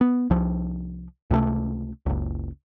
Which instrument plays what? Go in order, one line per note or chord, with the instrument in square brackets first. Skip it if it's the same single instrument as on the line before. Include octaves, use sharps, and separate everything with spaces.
[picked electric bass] B3
C2 F3
C#2 C3 F#3 A3
F#1 C#2